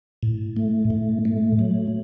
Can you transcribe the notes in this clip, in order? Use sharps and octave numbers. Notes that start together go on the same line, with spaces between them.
A2
A3
A2
A3
F#3